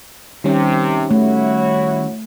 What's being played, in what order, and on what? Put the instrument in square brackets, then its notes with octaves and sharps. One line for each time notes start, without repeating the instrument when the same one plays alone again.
[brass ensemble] C3 [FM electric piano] D#3 G3 C#4
[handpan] A3 [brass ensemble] E4 F#4 C#5